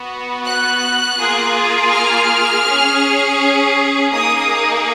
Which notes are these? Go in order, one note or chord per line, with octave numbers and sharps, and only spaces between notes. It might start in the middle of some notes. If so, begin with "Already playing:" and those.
Already playing: B3 F#4
F#6
A#3 F4 G#4
F6
C#4 G#4
A#3 D#4 G#4 D#6